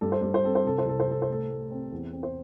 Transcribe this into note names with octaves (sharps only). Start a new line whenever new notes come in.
G2 A4
C5
G2 A4
C5
C4 A4
C5
C3 A4
C5
C2 A4
C5
C2 A4
C5
A2 A4
A3
C4
E2
C4
C5